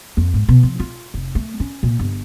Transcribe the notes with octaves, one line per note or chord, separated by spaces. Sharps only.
F2
G#2
B2
F3
F4
F1
A3
C#4
A#2
G1